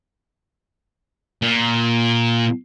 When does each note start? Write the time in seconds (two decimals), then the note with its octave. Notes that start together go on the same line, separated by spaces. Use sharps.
1.42 A#2